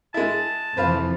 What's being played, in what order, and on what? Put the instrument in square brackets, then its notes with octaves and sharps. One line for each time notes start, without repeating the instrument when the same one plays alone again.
[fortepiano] G#3 E4 [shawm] A5
[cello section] F2 C3 E3 [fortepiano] F4 B4 C5